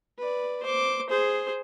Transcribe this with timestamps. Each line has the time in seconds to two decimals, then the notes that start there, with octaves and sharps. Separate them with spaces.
0.18 B4 D5
0.63 C5 D6
1.10 G#4 C5